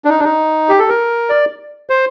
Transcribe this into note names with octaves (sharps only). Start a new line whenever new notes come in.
D4
D#4
D4
D#4
G4
A4
A#4
D5
C5